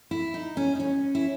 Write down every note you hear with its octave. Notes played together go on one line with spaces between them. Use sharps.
E4
D#4
C#4
D#4
C#4
E4